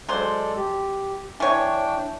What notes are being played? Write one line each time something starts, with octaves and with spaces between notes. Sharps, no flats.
F#3 G#3 A4 C5 D5
G4
E3 D4 C#5 G5